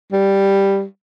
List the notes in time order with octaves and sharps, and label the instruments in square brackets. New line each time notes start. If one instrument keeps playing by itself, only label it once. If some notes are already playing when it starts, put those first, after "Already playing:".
[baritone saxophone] G3